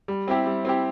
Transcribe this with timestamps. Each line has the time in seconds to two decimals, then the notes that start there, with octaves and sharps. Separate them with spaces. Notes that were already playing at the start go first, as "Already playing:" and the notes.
0.08 G3
0.28 C4 E4 G4
0.46 G3
0.65 C4 E4 G4